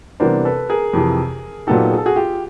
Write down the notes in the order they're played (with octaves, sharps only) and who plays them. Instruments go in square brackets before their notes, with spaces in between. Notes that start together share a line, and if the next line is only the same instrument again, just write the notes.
[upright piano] C3 E3 G3 B3 D4 A#4 C5
A4 B4
G#4 A#4
F2 C3 E3
A#2 F#3 B3 D#4 G4 A4
G#4
A4
F#4 G#4
F4 G4